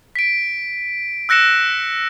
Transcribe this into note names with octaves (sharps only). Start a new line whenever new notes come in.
B6 D7
E6 F#6 A#6 C#7 E7